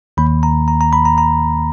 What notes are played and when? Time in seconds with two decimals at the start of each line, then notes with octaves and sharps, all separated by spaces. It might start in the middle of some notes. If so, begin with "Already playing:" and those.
0.17 D#2 D#3 A#3 B5
0.43 A#5
0.68 A#5
0.81 A#5
0.93 B5
1.05 A#5
1.18 A#5